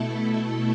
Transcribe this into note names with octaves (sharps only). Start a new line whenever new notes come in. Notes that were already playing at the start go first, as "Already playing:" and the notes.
Already playing: B2 A3 E4 A4